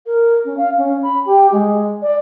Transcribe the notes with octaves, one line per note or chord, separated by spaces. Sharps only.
A#4
C#4
F5
C#4
B5
G4
G#3
D5